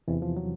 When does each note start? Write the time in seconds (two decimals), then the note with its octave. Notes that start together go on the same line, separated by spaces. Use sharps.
0.08 E2 C3 E3
0.22 F3
0.36 F#3